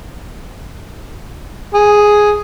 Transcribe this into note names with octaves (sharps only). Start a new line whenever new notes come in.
G#4